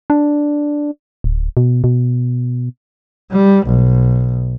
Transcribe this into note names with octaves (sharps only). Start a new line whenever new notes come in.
D4
D1
B2
B2
G3
B1